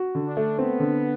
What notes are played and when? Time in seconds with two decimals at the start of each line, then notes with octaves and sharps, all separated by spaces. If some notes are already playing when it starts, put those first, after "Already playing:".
Already playing: F#4
0.15 D3
0.25 D4
0.37 A3
0.58 B3 C4
0.80 D3